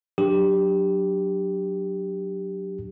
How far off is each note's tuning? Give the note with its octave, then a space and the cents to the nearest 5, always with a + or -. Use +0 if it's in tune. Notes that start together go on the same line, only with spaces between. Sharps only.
F#3 +0 D4 +0 G4 +0